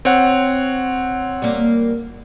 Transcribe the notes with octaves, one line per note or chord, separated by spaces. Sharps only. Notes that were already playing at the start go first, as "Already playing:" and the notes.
C4 C#5 F#5
G3 A#3